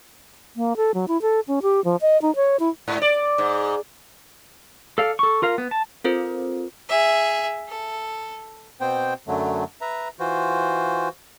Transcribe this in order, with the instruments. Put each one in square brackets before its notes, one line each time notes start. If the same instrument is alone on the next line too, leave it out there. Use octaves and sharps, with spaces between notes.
[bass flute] A#3
A4
F#3
E4
A4
C#4
G4
F3
D#5
D#4
C#5
E4
[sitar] G#2
D5
G#2
[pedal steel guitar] A4 D5 F5
A4 C#6
F4 A#4 F5
B3
A5
[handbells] C4 F4 A4 A#4 C5
[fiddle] G#4 E5
A4
[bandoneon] B2 B3 C4 C5 G5
F#2 D3 F#3 A3
B4 E5 A#5
E3 F4 F#4 C5